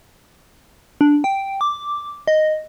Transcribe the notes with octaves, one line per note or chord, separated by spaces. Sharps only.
D4
G5
D6
D#5